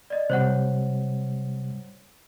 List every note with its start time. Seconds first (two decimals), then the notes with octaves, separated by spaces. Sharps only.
0.10 D5 D#5
0.30 C3 G3 C5 C#5 F#5